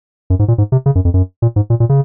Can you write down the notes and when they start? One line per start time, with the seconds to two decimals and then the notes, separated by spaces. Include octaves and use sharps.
0.30 F#2
0.39 G#2
0.48 A#2
0.58 G#2
0.72 C3
0.86 C#3
0.95 F#2
1.05 F2
1.14 F#2
1.42 A#2
1.56 G#2
1.70 A#2
1.80 A#2
1.89 C#3